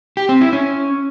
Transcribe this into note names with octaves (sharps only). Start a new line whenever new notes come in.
G4
C4
E4
C#4